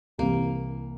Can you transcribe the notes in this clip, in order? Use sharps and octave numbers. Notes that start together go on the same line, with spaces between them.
C2 C3 E3 A#3